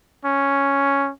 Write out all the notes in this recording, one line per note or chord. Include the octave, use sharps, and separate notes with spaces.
C#4